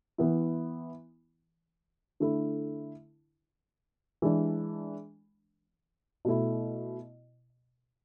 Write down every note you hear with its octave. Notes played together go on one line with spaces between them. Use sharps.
E3 B3 E4
D3 A3 E4
E3 G#3 D4
B2 A3 E4